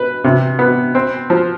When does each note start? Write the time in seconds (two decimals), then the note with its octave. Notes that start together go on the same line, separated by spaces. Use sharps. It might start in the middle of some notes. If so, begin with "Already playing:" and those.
Already playing: B4
0.24 C3
0.59 B3
0.95 C4
1.30 F3